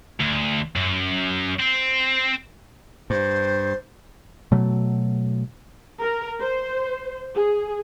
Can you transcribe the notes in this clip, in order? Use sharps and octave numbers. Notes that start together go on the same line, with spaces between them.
D2
F#2
C4
G2 C5
B2 F#3 A3
A#4
C5
G#4